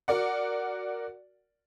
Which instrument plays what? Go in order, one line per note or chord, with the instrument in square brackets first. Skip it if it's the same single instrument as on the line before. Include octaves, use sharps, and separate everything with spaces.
[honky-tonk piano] F#4 A#4 D5 F#5